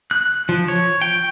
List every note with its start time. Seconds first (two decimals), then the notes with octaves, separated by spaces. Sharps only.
0.11 F#6
0.49 F3
0.68 C#5
1.02 G5